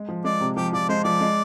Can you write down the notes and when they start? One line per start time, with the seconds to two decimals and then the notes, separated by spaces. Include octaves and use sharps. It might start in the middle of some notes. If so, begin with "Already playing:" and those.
Already playing: G#3
0.08 F3
0.24 G#3 D5
0.40 C3
0.57 F3 G4
0.73 F3 D5
0.89 G#3 C5
1.04 F3 D5
1.21 G#3